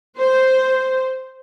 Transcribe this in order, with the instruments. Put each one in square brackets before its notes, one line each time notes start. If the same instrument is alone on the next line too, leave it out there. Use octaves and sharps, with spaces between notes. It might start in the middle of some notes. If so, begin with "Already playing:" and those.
[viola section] C5